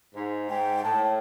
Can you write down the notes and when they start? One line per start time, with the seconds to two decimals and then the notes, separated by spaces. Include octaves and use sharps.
0.15 G#2
0.49 G#2 G5
0.84 A2 A5